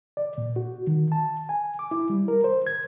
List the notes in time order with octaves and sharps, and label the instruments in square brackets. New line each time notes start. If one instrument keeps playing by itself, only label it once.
[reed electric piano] D5
A#2
F#4
D#3
A5
G#5
D6
E4
G3
A#4
C5
G#6